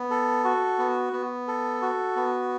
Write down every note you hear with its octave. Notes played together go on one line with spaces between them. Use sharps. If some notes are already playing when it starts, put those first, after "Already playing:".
Already playing: B3
A4
F#4
B3
B3
A4
F#4
B3